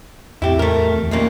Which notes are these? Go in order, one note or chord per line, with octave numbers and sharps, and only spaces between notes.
E2 A2 C4 E4 G4
A3 A#4
D1 E2
D#2 A#2 A3 A#3 C#4